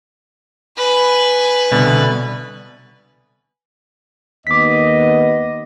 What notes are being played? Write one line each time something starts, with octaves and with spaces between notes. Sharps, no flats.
B4 G#5
C2 B2 D3
D#2 B3 D#5 D6 B6